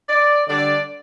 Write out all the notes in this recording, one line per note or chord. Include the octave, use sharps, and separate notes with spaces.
D5
D3 G3 D4 D5